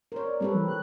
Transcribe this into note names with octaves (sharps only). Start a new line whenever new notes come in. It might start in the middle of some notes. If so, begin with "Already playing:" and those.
A#4 C5 C#5
D5
G3 C4 A4 B4
E3
F#6